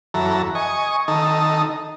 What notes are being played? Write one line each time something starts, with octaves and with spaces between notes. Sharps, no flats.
F#2 E3 A4 A#5
D#5 G#5 C#6
D#3 D#4 A4